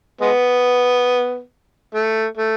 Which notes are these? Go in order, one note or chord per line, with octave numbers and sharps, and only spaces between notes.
G#3 B3
A3
A3